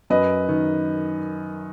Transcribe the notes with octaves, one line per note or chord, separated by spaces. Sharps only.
F#2 B4 D#5
D#3